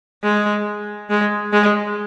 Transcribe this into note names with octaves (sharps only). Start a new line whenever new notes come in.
G#3
G#3
G#3